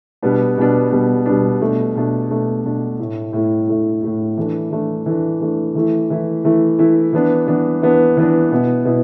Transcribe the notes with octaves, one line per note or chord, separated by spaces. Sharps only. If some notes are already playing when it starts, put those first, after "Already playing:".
B2 G3 B3 D4
B2 G3 B3 D4
B2 G3 B3 D4
B2 G3 B3 D4
B2 A3 D4
B2 A3 D4
B2 A3 D4
B2 A3 D4
A2 A3 E4
A2 A3 E4
A2 A3 E4
A2 A3 E4
E3 A3 D4
E3 A3 D4
E3 A3 D4
E3 A3 D4
E3 A3 E4
E3 A3 E4
E3 A3 E4
E3 A3 E4
E3 B3 D4
E3 B3 D4
E3 B3 D4
E3 B3 D4
B2 B3 E4
B2 B3 E4